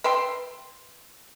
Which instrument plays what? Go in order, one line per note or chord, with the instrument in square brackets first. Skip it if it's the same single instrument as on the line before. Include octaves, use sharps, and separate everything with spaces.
[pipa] B4 E5 G5 C6